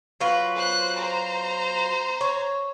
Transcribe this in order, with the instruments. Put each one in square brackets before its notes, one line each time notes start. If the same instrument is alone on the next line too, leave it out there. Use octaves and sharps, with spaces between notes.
[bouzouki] F#3 F4 B4
[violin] C5 F#6
C5 A#5
[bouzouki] C#5